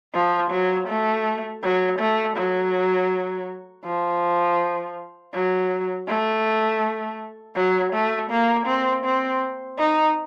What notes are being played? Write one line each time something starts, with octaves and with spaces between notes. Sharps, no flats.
F3
F#3
A3
F#3
A3
F#3
F3
F#3
A3
F#3
A3
A#3
C4
C4
D#4